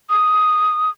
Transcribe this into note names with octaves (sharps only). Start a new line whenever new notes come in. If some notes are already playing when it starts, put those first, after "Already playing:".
D#6